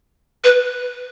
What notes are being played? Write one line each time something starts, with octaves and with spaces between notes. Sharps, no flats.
B4